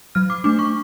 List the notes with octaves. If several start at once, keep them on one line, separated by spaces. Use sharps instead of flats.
F#3 F6
D6
A3 D4 D6
C#6